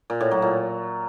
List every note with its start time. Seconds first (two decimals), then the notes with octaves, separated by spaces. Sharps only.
0.10 A#2
0.21 A2
0.31 F#3
0.42 A#2